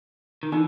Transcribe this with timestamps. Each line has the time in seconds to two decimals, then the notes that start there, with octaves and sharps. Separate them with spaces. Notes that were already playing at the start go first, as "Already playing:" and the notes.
0.43 D#3
0.52 D3 E3 D#4